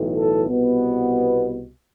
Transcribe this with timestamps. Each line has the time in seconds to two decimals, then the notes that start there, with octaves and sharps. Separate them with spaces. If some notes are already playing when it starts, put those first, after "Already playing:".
Already playing: B1 A2 E3
0.17 A4
0.48 C2 B2 B3